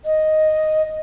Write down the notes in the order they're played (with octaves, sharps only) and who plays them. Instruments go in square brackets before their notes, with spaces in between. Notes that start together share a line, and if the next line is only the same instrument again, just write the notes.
[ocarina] D#5